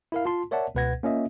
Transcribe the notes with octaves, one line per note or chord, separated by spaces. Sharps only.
E4 A#4 F5
F4 A5 C6
A#4 C#5 D5 E5 F#5 A5
C#2 B2 B4 F#5 G#6 A#6
A#3 C#4 F4 D#5 E5